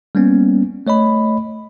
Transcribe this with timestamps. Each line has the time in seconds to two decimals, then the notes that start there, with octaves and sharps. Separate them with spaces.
0.15 G3 A#3 B3 C#4
0.87 A3 C#5 D#5 B5